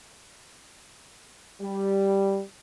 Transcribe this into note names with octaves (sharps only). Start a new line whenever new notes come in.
G3